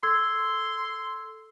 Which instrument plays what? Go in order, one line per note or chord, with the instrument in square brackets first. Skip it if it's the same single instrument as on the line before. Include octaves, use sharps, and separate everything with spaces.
[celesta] A4 E6 G#6 [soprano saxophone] C6